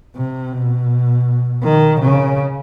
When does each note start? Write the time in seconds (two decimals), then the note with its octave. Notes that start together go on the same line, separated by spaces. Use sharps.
0.16 C3
0.53 B2
1.64 D#3
2.01 C#3